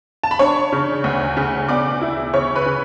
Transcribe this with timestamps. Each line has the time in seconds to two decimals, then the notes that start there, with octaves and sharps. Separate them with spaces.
0.23 A5
0.31 B5
0.39 D4 C#5 C#6
0.72 C#3
1.04 D2
1.37 C#3
1.68 B2 D5 D6
2.02 E4
2.34 C#3 C#5 C#6
2.56 B4 B5
2.66 C#3